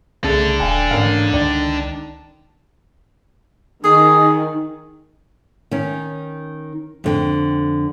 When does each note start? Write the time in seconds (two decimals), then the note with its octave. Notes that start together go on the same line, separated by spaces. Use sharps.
0.24 C2 C#3 A3 D4 A4
0.60 D#1 F5 G5 G#5
0.91 A1 G#2 A#4 F5
1.33 C#2 D#3 D5
3.84 D#3 G#4
5.71 D#3 C#4
7.04 F2 D3 G5